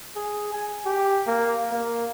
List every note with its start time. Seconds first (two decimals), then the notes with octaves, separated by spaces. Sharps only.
0.16 G#4
0.53 G#5
0.86 G4
1.27 A#3
1.71 A#3